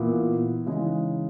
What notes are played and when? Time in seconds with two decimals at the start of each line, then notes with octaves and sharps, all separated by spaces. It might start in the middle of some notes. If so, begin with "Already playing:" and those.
Already playing: A#2 E3 B3 E4
0.67 C#3 E3 G#3 D#4